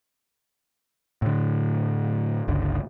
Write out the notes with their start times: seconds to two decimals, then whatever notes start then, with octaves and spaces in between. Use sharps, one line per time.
1.22 A2 D3
2.48 G1 C#2 D3